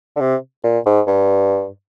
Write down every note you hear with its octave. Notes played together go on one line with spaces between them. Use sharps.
D3
C3
A#2
G#2
G2